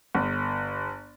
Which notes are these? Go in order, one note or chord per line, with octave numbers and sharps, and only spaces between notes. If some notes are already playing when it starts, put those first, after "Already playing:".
G1